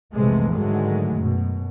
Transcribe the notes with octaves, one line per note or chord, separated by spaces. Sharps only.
B1 F2 C3 E3 G#3 A3
G#2 D3 D#3 F#3 G#3 A3
F#2 B2